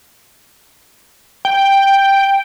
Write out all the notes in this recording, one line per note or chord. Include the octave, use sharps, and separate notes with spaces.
G5